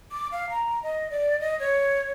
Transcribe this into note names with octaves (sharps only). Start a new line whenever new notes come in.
D6
F5
A#5
D#5
D5
D#5
C#5